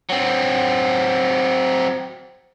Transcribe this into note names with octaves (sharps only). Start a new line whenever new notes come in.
F#3 C4